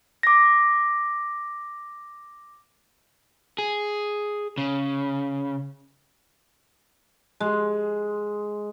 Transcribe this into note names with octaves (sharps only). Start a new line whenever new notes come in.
D6 A#6
G#4
C#3
G#3